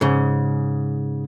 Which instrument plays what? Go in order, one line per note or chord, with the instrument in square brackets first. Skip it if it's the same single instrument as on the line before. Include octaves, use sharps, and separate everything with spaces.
[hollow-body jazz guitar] G#2 C#3